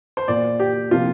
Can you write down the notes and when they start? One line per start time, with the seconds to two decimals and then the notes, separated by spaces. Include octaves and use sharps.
0.17 C5
0.28 A#2 A#3 D5
0.60 G4
0.91 C3 F3 A#3 F4